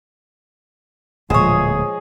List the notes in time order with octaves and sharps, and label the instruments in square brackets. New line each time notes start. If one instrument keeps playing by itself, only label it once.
[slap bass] D1 [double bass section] A#2 F3 G#3 [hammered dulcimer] G#4 D#5 [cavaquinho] C5 C#5